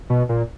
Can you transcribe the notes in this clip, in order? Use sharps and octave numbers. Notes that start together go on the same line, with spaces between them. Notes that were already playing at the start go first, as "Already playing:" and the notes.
B2
A#2